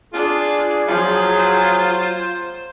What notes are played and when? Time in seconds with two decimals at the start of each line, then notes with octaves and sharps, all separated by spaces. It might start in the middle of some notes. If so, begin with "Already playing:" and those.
0.14 D4 F4 G#4
0.88 F3 F#3 F4
1.37 C5